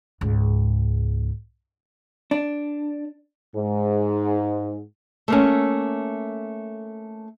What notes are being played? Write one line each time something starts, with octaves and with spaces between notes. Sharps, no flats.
C#2 G#2
D4
G#2
A3 A#3 C#4